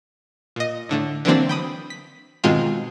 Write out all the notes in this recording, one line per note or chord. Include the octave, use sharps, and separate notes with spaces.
A#2 D#5
A2 D3 A3
D3 E3 F#3 A#3 C4 D4
G5 B5 D#6
B6
G#2 B2 D#3 G#3 C4 F4